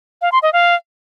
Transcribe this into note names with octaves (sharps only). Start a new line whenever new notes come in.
F5
C6
D#5
F5